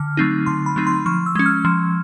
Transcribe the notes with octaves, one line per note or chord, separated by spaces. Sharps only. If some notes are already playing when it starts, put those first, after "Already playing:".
Already playing: D3 F6
F#3 A3 C4 D#4
D3 C6
B5
F#3 A3 C4 D#4
C6
F3 C#6
E6
G#3 C#4
F6
F3